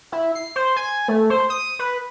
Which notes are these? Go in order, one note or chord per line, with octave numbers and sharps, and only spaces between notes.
E4
C7
C5
G#5
A3
C5
D#6
B4